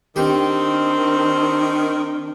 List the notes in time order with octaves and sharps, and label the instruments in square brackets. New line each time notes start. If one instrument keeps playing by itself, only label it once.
[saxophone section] D#3 [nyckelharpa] C4 [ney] D4 [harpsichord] G4